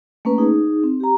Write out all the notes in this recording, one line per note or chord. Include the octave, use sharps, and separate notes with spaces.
A3 A#3 C#4 B4
D#4 G#4
C4
G4 A#5